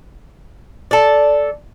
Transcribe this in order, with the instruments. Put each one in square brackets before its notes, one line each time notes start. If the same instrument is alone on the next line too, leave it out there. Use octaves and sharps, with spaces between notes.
[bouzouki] A4 D5